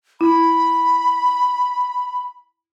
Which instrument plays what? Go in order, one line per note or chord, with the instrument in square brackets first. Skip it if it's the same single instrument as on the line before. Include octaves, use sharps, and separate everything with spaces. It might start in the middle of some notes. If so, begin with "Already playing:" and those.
[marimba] E4 [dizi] B5